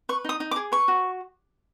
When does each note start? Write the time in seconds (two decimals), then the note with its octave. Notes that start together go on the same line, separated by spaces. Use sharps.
0.09 B4 C#6
0.25 D#4 D#6
0.40 D#4
0.51 D6
0.56 G#4
0.72 B4 C#6
0.88 F#4